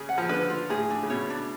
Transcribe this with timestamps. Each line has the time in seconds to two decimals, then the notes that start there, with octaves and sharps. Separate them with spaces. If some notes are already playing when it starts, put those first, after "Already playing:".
Already playing: C#3 G#4
0.09 F#5
0.18 F3
0.29 D3 B4
0.50 F4
0.70 A2 G#4
0.90 D4
1.03 C#3
1.10 B2 C#5
1.30 D4